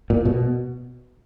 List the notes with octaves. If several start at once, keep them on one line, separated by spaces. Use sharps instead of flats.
A#2
B2